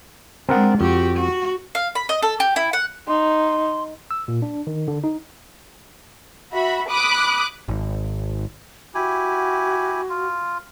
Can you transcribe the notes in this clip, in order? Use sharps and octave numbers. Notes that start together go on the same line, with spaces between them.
G#3 C4 D4 A#4 F#5
F2 F#4 G4
F#4
F5
B5
D#5
A4
G4
E4
F#5
D#4 C6
E6
A#2
D4
D#3
D3
D#4
F#4 E5 B5
B5 D6 D#6 F#6
G#1
E4 F#4 G4 G#5
F4